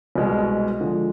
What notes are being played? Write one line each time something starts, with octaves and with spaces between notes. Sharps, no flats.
C2 B2 G#3
D3 F3 G#3